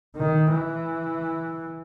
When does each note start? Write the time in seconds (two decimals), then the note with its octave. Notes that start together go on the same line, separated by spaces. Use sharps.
0.17 D#3
0.52 E3